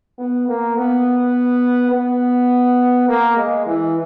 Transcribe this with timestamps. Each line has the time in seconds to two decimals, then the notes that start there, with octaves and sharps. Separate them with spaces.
0.19 B3
0.48 A#3
0.77 B3
1.92 B3
3.08 A#3
3.37 G#3
3.66 E3